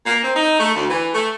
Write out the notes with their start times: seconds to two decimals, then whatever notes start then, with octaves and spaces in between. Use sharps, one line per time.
0.06 A#3
0.24 C4
0.36 D#4
0.60 A3
0.75 D2
0.90 E3
1.14 A3